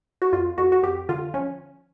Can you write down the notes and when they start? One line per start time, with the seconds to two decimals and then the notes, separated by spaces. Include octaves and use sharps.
0.22 F#4
0.33 F2 F4
0.58 F2 F#4
0.72 F#4
0.83 F2 G4
1.09 D3 F4
1.34 F3 C#4